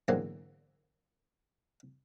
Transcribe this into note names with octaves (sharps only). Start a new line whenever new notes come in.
E2 G#2 D3 F#3 A#3 C4